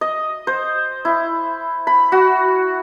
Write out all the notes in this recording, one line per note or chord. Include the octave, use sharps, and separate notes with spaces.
D#5
C5
E4
B5
F#4